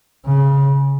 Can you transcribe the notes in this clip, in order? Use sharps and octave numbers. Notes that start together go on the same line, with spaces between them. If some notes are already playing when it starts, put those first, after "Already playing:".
C#3